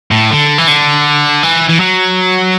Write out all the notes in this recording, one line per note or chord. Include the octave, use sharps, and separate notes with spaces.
A2
D3
E3
D3
E3
E3
F#3